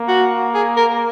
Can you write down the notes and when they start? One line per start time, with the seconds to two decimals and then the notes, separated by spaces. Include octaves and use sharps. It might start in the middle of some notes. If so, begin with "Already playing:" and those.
Already playing: A#3
0.08 F#4
0.55 G#4
0.77 A#4